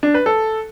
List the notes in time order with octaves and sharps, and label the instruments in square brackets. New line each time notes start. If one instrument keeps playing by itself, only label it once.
[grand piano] D4
B4
A4